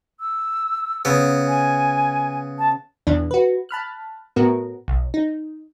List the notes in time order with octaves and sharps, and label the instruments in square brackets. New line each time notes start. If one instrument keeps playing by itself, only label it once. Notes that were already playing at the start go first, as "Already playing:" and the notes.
[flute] E6
[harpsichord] C#3 B3
[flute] G#5
A5
[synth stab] E2 B2 E3 D4
F#4 B4
A5 B5 F6 F#6
A2 B3 F#4 A#4
B1
D#4